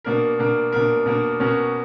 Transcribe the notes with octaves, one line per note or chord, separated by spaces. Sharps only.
B2 A#3 D4 A#4
B2 A#3 D4 A#4
B2 A#3 D4 A#4
B2 A#3 D4 A#4
B2 A#3 C#4 F#4 A#4